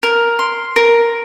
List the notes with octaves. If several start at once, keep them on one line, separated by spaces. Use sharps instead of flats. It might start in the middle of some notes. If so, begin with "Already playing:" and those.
A#4
C6
A#4